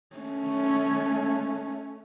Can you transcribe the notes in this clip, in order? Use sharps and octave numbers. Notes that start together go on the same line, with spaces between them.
A3 C#4